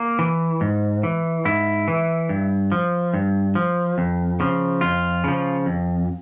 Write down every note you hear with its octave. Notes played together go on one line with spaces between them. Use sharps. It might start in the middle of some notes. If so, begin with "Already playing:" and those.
Already playing: A#3
E3
G#2
E3
G#2 E4
E3
G2
F3
G2
F3
F2
C#3 F3
F2 F4
C#3 F3
F2